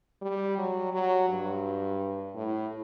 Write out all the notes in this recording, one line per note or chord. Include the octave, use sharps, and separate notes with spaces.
G3
F#3
F#3
G2
A2